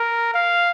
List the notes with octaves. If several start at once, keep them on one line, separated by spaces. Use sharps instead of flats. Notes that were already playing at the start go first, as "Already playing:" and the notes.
Already playing: A#4
F5